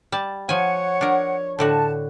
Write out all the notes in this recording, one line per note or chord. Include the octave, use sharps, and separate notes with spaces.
G3 A5
F3 C#5 F#5 G#5
D4 A#4
A2 D3 F#4 A5